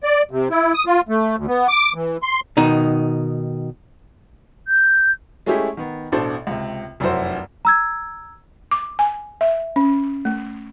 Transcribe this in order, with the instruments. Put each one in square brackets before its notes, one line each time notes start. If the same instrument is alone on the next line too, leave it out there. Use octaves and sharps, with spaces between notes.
[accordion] D5
C3
E4
D#6
F4
A3
D2
B3
D6
E3
C6
[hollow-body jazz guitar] B2 D#3 D#4
[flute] G6
[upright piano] G#3 A3 C#4 E4 G4 G#4
D#3 B3
A1 B2 D4 A4 C5
C#2 C3
F1 F#2 E4 F#4 C5
[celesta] A#5 E6 G#6
[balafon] D6
G#5
E5
C#4
A3